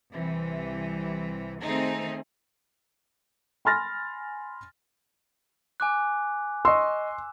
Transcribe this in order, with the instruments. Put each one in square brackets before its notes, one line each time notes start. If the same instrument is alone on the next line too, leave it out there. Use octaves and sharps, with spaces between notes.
[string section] C2 C3 E3
D#3 A3 C4 D#4 G#4
[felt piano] G#5 B5 C6 F6 A6 A#6
[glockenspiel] G#5 D6 F#6
[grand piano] D#5 C#6 E6 [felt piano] C6